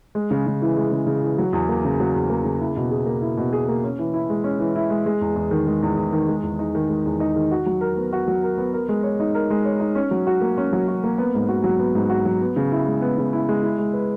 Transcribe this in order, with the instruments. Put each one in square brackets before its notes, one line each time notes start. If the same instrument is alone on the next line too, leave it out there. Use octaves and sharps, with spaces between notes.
[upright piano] G#3
C#3
C#3
E3
G#3
C#3
C#3
E3
F#3
E2
A#3
C#3
F#3
E2
A#3
C#3
E4
B2
G#4
A#3
E4
B2
G#4
A#3
C#4
E3
E4
G#3
C#4
E3
E4
G#3
G#3
E2
E2
D#3
G#3
E2
E2
D#3
G#3
E2
D#4
D#3
G#3
E2
D#4
D#3
F#4
F#3
A#4
B3
F#4
F#3
A#4
B3
A#4
G#3
C#5
D#4
A#4
G#3
C#5
D#4
C#4
F#3
F#4
A#3
C#4
F#3
F#4
A#3
B3
G#2
F#4
F#3
B3
G#2
F#4
F#3
B3
C#3
E4
G#3
B3
C#3
E4
G#3
E4
G#3
B4